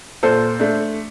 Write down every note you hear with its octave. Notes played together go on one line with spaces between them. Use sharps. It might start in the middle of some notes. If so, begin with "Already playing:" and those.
A#2 A4 C5
A3 D4